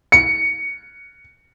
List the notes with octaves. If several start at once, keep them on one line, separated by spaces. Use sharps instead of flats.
C#7